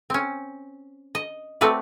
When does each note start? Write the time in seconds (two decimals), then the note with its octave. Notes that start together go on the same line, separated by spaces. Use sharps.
0.10 C4 C#4
1.15 D#5
1.61 A3 C4 F#4 B4 D5